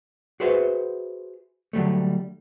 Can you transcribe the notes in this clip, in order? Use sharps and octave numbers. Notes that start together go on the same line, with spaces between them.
F#4 G#4 B4 C5 E5 F#5
D3 F#3 G3 A3